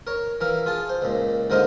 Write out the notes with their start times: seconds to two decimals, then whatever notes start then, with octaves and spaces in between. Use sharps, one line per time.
0.07 A#4 C#5
0.41 E3 A#4 F5
0.66 F4 G#4 A5
0.89 C5
1.02 C#2 A#2
1.50 G#2 D3 A#4 C5 D#5 F5